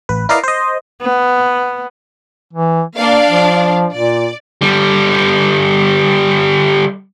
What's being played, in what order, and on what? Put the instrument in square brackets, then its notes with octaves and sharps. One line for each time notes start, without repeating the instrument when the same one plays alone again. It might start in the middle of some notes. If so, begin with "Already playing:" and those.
[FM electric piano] A1 B4
E4 A#4 B4 D5 D#5 F5
C5 D#5
[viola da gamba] B3
[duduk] E3
[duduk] A#3 [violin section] D4 D5 F5
[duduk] F3
[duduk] A#2 [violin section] D5
[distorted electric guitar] D3 G3